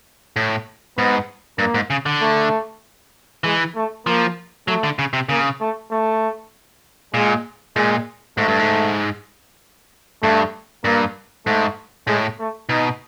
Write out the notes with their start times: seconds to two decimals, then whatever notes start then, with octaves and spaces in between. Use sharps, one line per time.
0.36 A2
0.98 G#2 B3
1.59 G2 A#3
1.75 G#2
1.90 C#3
2.06 D3
2.21 A3
3.44 E3 G#3
3.75 A3
4.06 F3 A#3
4.68 F#3 A3
4.84 D3
4.99 C#3
5.13 C3
5.29 C#3 A#3
5.60 A3
5.91 A3
7.14 A#2 G#3
7.76 A#2 G#3
8.38 G#2 A3
8.48 G2
8.59 G#2
10.22 G2 A3
10.85 G2 A#3
11.46 G#2 A3
12.07 A2 G#3
12.39 A3
12.69 B2 D#4